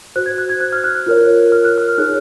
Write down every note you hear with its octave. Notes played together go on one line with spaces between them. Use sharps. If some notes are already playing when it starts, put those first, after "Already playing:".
F#4 C5 F#6
G#6
F#6
G#6
F#6
F6
F#6
F#6
F4 A#4 C#5
F6
F#6
F6
D#4 G#4 C#5 F#6